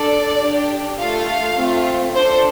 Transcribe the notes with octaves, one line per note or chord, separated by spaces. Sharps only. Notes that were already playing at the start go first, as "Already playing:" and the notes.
Already playing: D4 A4 D5
D4 G4
A3 F4 A4 F5
A3 C4 F4
D4 A4 C5